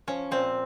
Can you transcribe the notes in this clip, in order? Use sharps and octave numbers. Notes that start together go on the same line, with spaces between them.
F3 C#4
A#2 C4